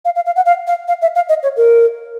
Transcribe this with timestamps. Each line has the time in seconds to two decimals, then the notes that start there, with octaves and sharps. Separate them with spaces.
0.05 F5
0.15 F5
0.26 F5
0.36 F#5
0.46 F5
0.67 F5
0.88 F5
1.02 E5
1.15 F5
1.29 D#5
1.43 C#5
1.57 A#4